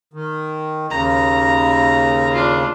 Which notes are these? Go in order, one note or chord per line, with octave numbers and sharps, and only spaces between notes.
D#3
D#2 C#3 A#5
D4 F4